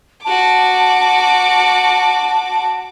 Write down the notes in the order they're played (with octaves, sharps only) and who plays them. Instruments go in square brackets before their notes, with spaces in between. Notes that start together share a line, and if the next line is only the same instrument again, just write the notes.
[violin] F#4 D6 [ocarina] A5